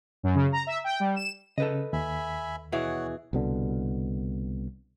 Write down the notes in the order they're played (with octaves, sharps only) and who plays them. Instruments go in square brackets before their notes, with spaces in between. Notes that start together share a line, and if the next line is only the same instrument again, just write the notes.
[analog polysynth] F#2
C#3
A#5
E5
G5
G3
E7
[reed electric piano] C#3 [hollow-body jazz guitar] A4 B4 D#5
[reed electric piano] D#2 [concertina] E5 G#5 B5
[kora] B2 E3 G#4 [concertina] C#5 F#5
[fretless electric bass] C2 B2 D3